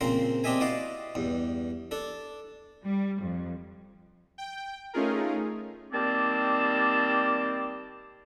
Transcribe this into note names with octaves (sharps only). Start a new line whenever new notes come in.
A#2 C#3 C4 A#4 C5
C4 D4 G4 D#5 E5 G#5
E4 F#4 D5 D#5 F5
E2 G2
D4 A4
G3
F2
G5
A3 C#4 D#4 F4 G#4 A#4
D#3 G3 A#3 C4 D5 A5